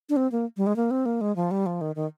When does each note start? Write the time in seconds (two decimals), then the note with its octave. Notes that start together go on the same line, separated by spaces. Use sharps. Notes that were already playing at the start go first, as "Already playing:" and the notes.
0.09 D4
0.16 C4
0.32 A#3
0.57 G3
0.66 G#3
0.76 A#3
0.91 C4
1.06 A#3
1.21 G#3
1.36 F3
1.51 G3
1.66 F3
1.81 D#3
1.96 D#3